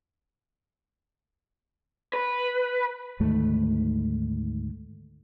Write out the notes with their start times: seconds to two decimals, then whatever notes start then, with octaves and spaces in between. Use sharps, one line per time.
2.13 B4
3.20 D2 G#2 D#3 A3